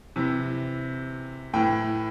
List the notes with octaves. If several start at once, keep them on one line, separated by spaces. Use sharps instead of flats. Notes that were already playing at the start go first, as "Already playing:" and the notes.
C3 E3
A2 E3 G5